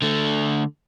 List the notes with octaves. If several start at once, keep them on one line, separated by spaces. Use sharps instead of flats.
D3 A3